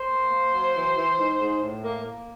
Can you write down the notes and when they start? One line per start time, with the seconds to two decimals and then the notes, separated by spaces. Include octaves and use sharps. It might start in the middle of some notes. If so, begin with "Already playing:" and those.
Already playing: C5
0.09 A#3
0.30 A#3
0.52 F#3
0.74 E3
0.96 E3
1.17 G#2
1.40 G#2
1.61 A2
1.84 A#3
2.05 A#3